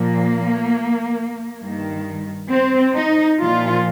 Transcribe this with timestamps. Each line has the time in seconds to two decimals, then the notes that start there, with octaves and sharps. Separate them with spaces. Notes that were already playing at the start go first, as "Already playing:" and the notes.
Already playing: A#2 F3 A#3
1.60 G2 D#3
2.50 C4
2.94 D#4
3.39 A#2 F3 F4